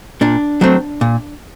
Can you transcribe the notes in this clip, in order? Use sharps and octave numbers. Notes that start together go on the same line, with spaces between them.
A#2 D4
F#3 A3 C4
A#2